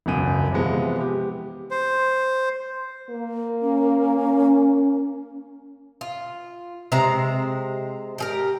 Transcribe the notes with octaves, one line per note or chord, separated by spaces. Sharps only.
E1 C#2 F#2 D#7
C3 E3 F3 G#3 B3 C4
G4
C5
A#3
C#4
F4
C3 G#3 C5 A#5
G4 G#4 A#4